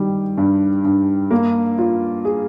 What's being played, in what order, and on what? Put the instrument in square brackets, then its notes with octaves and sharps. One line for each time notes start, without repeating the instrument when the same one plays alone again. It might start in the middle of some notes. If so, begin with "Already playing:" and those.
Already playing: [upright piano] D#3 G3
G2
G2
A#3
F4
G#4